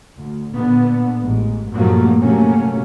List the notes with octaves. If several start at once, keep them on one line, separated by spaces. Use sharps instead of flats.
D2
A#2 D3 B3
A1 G#2
G2 A#2 F3 F#3 A3 A#3
C3 F#3 A3 A#3 C#4